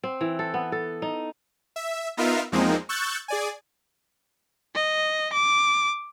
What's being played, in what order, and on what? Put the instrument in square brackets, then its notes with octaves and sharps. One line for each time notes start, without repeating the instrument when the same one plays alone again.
[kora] C4
E3
A4
B3
A4
D#4
[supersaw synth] E5
B3 D#4 F4 A#4 E5 F5
E2 F3 G#3 A#3 C4 D#4
C#6 E6 F#6 G6 A6
G#4 D5 G#5
[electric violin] D#5
D6